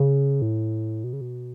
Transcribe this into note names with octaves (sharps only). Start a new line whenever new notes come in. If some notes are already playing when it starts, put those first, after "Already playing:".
Already playing: C#3
A2
B2
C#3
B2